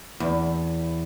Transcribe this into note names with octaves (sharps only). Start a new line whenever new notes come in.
E2